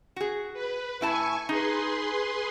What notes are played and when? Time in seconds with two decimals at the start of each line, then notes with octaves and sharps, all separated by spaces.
0.16 F#4 G#4
0.54 B4
1.01 A2 E4 G#5 A5 C#6
1.49 D#4 G#4 B4 C6